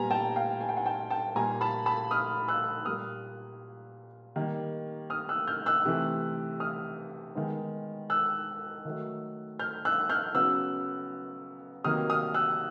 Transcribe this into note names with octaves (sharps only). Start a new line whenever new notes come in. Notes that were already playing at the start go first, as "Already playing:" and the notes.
Already playing: A#2 G3 B3 G#5 A#5
G5 A5
F5 G5
G#5
G5
F#5 G#5
G5 A5
G5 A5
A#2 G3 A#3 G#5 A#5
A5 B5
A5 B5
D#6 F6
E6 F#6
A#2 G3 A#3 D#6 F6
D#3 G3 A#3
D#6 F6
E6 F#6
F6 G6
E6 F#6
C3 E3 A3
D#6 F6
D#3 G#3 B3
E6 F#6
D#3 F#3 A3
F6 G6
E6 F#6
F6 G6
C#3 F#3 B3 E6 F#6
C3 D#3 F#3 A#3 D#6 F6
D#6 F6
E6 F#6